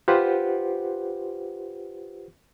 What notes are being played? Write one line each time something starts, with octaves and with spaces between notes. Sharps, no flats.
F4 G4 B4 C5 F#5